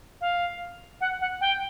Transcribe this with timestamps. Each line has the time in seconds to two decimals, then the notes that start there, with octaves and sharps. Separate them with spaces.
0.21 F5
1.01 F#5
1.20 F#5
1.41 G5